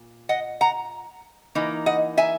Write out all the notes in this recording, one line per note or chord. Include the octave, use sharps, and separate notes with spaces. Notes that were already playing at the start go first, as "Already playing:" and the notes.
Already playing: A#2
D#5 F#5
F#5 A#5
E3 A#3 D#4
D#5 F#5
E5 G#5